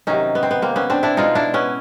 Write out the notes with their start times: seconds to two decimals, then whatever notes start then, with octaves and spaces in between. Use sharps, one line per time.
0.07 C3 D#3 F#3 C#4 D#4
0.35 B3
0.43 C4
0.51 B3
0.62 A#3 C4
0.76 B3 C#4
0.90 C4 D4
1.03 D4 E4
1.17 B2 G#3 D#4 F4
1.35 D4 E4
1.54 B3 C#4